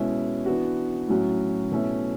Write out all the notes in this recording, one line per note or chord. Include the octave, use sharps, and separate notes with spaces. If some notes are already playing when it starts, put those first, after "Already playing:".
Already playing: B2 G#3 C#4 E4
E3 B3 D4 F#4
A2 F#3 C#4 F#4
B2 A3 C#4 E4